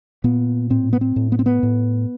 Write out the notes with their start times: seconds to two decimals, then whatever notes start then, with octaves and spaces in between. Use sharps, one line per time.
0.24 A#2 B3
0.70 A2 C4
0.93 B3
1.01 C4
1.16 A2
1.32 B3
1.39 C4
1.46 B3
1.63 A2